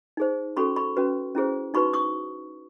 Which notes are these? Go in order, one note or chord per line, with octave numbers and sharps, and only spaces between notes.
D#4 G#4 C5
C#4 F#4 A4 B5 C#6
B5 C#6
C#4 F#4 B4
C#4 E4 G#4 C5
D#4 F#4 B4 B5 C#6
C#6 D#6